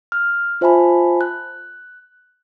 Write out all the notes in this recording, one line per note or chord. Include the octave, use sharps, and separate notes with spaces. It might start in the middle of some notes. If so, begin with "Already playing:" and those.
F6
F4 C5 E5 G#5 A5 B5
F#6